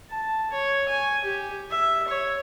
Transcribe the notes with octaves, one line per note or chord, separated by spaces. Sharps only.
A5
C#5
G#5
G4
E5
C#5